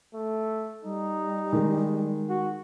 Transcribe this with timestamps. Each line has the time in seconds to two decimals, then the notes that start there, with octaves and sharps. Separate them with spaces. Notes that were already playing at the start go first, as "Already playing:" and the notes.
0.14 A3
0.84 G3 D#4
1.53 D#3 G#3
2.29 F#4